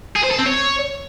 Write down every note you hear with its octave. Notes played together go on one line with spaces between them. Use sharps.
G#4
C5
A4
C4
C#5